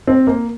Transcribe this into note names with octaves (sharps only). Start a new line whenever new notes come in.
C4
A#3